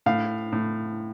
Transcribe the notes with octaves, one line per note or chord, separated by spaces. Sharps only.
A2 F5
A2